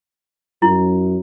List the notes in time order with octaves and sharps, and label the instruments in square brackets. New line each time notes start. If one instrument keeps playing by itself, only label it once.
[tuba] F#2 [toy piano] E4